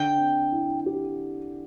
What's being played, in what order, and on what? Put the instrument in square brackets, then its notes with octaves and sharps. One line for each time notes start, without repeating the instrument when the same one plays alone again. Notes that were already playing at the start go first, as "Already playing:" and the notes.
Already playing: [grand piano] D3 [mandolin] G5
[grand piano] C4
E4
G4